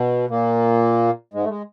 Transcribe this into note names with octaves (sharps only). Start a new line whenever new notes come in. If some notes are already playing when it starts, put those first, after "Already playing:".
Already playing: B2
A#2 A#3
G#2 G#3
A3
G#3